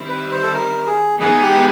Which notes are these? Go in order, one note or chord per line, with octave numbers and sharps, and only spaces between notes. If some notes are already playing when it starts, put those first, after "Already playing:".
Already playing: D#3 G3 C4 E4
B4
C5
A4
A#4
G#4
E3 G#3 B3 D#4 G#4
G4